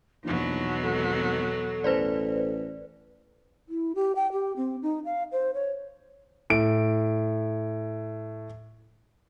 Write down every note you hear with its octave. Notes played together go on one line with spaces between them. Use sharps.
A#1 E2 B2 F#3 D#4
G#1 A4
A1 B4 C5 D5
E4
G4
G5
G4
C4
D#4
F5
C5
C#5
A2 D7